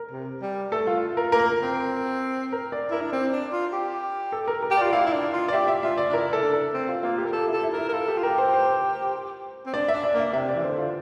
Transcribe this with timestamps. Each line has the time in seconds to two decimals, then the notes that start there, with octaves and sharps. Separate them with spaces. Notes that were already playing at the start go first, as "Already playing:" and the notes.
Already playing: A#4
0.11 C3
0.41 G3
0.72 A3 A4
0.87 F4
1.17 A#4
1.32 A#3 A#4
1.62 C4
2.52 A#4
2.72 D5
2.90 E4 A#4
3.01 D4
3.12 C4
3.32 D4
3.53 F4
3.73 G4
4.32 A4
4.48 A#4
4.62 A#4
4.70 G4
4.77 D5
4.81 F4
4.93 E4 F5
5.06 E4
5.13 D4
5.33 F4
5.48 D5
5.53 G4 E5
5.68 E5
5.83 F4 E5
5.98 D5
6.09 D4
6.12 E4 A#4
6.33 A4
6.42 D4
6.53 A4
6.73 C4
6.89 F4
7.03 A#3 F4
7.18 G4
7.26 A#4
7.33 G4 A4
7.48 E4
7.53 A4
7.63 E4
7.73 A#4
7.78 E4
7.89 A#4
7.93 F4 A4
8.08 G4
8.17 F4
8.23 G4 A#4
8.38 C5
8.54 C5
9.66 C4
9.74 D4 D5
9.88 E5
9.94 D4
10.04 D5
10.14 A#3 E5
10.33 C3 E5
10.49 D5
10.55 E3
10.64 D3 C5
10.78 F4